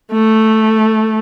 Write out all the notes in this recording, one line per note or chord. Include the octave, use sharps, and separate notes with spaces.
A3